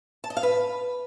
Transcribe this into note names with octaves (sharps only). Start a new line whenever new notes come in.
A5
D#5
F5
B4